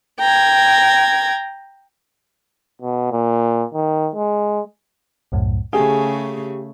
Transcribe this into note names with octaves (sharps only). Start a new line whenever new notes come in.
G5 A#5 G#6
B2
A#2
D#3
G#3
C2 F#2 A2
C#3 A3 G4 G#4